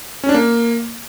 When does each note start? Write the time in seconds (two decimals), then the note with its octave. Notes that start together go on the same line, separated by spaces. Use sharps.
0.24 C#4
0.29 D4
0.34 A#3